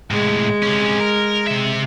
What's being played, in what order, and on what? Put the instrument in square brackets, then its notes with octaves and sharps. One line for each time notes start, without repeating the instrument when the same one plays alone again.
[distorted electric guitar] A2 C3 [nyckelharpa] G#3
[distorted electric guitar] C3 C#4
A#4
C3 E5